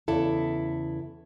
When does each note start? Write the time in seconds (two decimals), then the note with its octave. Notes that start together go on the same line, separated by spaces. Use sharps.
0.08 E2 C#3 E4 A4